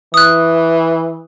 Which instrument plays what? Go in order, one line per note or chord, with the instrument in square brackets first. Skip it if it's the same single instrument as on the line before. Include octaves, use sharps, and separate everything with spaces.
[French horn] E3 [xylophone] D#6 F#6